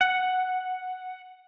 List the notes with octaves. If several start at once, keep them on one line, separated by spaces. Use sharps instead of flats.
F#5